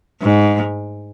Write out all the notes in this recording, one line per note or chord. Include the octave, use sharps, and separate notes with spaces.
G#2